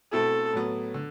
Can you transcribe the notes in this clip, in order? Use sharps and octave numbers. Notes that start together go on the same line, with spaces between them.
B2 A3 C4 E4 A4
A2 F#3 B3
D3